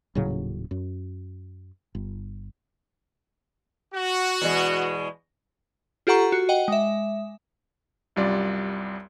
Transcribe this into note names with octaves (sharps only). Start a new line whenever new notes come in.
D#1 A2 C#3 F#3
F#2
G1
F#4
E2 B2 G#3
F4 G4 A4 F#5 A#5 C#6
F#4
D#5 F#5 G5
G#3 E5
C2 F#2 G3 F4 D5